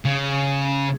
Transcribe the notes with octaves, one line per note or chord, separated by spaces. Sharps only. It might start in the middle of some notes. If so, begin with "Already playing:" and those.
C#3